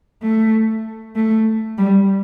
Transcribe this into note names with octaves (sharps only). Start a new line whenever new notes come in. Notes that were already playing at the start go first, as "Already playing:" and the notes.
A3
A3
G3